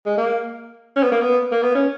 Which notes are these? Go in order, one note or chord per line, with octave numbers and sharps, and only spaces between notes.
G#3
A#3
C#4
B3
A#3
B3
A#3
B3
C#4